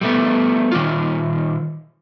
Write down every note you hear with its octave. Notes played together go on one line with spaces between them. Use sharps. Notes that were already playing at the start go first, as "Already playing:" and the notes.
G3 A3 B3
D#3 G3 F4